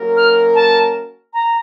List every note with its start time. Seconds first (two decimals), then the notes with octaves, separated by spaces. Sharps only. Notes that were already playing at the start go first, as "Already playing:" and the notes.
Already playing: F#3 A#3 C#4 F#4 A#4
0.16 F6
0.55 A5
1.33 A#5